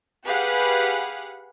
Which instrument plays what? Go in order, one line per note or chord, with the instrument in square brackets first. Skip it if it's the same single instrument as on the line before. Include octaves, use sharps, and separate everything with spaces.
[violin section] G4 G#4 B4 F5 F#5